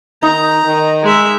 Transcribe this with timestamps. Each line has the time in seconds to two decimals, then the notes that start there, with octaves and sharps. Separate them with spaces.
0.23 D#3 D#4 A#5
0.64 D#3
1.03 G#3 E5